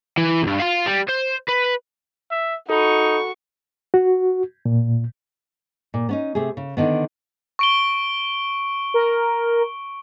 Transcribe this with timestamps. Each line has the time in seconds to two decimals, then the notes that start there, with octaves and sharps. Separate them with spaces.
0.18 E3
0.43 B1 G2
0.60 F5 C6
0.86 G3
1.08 C5
1.48 B4
2.31 E5
2.70 D#4 F#4 A4 B5 C#6
3.94 F#4
4.66 A#2
5.94 A#2
6.09 B3 C#4 D#4
6.35 C3 A3 G#4
6.57 C#3
6.77 D3 D#3 B3
7.59 C#6 D7 G7
8.94 A#4